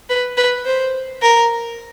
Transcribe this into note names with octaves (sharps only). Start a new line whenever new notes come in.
B4
B4
C5
A#4